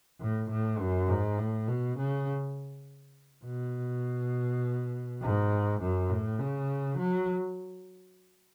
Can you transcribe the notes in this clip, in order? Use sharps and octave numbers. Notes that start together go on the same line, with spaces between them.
A2
A2
F#2
G#2
A2
B2
C#3
B2
G#2
F#2
A2
C#3
F#3